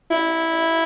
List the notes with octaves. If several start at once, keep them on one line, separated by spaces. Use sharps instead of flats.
E4